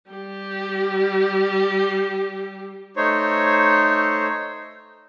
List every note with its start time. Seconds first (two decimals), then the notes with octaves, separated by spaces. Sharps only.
0.11 G3 G4
2.97 A3 D#4 C5 C#5